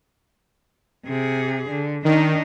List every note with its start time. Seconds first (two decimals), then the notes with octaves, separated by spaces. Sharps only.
1.06 C3 G#4
1.70 D3
2.05 D#3 D4 D#4